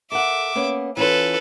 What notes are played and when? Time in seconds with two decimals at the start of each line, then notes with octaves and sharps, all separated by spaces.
0.12 A4 A#4 E5 F#5 D6
0.55 A#3 B3 C#4
0.97 E3 C#4 F4 A4 B4